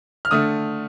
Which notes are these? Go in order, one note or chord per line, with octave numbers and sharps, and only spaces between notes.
F6
D3 A3 D#6